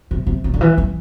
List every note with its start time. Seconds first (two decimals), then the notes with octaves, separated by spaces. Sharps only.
0.11 C3
0.27 C3
0.44 C3
0.54 D3
0.61 E3
0.78 E3